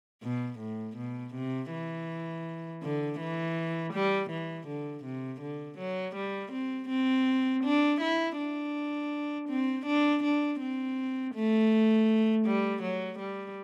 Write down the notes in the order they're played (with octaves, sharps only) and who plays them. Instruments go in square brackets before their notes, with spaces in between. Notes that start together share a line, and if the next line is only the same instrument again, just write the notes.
[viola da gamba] B2
A2
B2
C3
E3
D3
E3
G3
E3
D3
C3
D3
F#3
G3
C4
C4
D4
E4
D4
C4
D4
D4
C4
A3
G3
F#3
G3